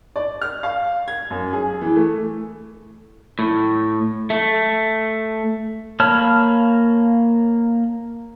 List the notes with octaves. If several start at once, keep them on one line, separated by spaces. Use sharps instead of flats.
D5
F6
F5
G#6
F#2
G#4
E3
A3
A2
A3
A#3 C#5 A5 B5 F6